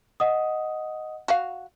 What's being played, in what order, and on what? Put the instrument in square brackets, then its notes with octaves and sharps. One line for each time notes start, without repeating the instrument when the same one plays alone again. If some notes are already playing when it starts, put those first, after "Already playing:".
[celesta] D#5 F#5 D#6
[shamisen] F#4 F5